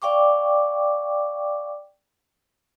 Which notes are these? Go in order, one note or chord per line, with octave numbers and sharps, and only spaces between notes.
D5 F5 G5 C#6 D6